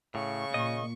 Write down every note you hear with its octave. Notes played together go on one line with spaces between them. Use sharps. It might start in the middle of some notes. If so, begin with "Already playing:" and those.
A2 C#3 C#6
A#2 D#5